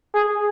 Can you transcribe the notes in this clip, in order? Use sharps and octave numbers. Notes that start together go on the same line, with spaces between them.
G#4